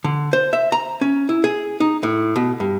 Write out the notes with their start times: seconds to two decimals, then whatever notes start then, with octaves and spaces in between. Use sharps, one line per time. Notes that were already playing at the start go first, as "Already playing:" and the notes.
0.04 D3
0.33 C5
0.53 E5
0.72 A#5
1.01 C#4
1.29 E4
1.44 G#4
1.80 D#4
2.03 A2
2.36 B2
2.60 G2